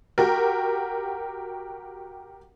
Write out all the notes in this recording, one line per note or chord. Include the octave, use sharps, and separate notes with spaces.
F#4 G4 A#4